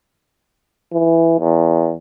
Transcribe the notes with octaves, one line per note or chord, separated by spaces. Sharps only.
E3
E2